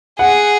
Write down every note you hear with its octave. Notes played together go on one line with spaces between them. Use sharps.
G#4 F#5